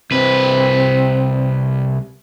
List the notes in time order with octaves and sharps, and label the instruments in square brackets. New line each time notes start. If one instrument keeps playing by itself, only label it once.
[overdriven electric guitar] C2 B4 [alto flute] C4